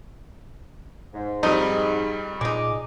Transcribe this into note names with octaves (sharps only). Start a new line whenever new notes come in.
G#2
F2 G3 D#4
A#2 G#3 D#4 G#4 D6